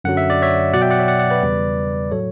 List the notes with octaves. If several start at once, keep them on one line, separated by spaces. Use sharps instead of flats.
F#2 D3 F#3 F#5
E5
D5
C#5 E5
B2 F#3 D5 F#5
E5 G5
D5 F#5
C#5 E5
D5 F#5
D5 F#5
B4 D5
E2 C#3 G3
A2 F#3 A4 C#5